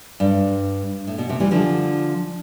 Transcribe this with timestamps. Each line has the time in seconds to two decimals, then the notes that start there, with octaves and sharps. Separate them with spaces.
0.20 G2
1.07 A2
1.18 B2
1.29 C3
1.40 E3 G3
1.51 D3 F3